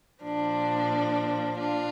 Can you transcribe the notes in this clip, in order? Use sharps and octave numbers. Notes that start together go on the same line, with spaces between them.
A#2 F3 D4
D4 F4